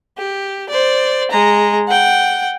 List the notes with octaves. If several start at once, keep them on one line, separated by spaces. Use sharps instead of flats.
G4
C5 D5
G#3 A#5
F#5 G5